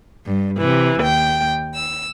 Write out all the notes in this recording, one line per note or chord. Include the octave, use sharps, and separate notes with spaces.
G2
C3 E3
D#2 G5
E6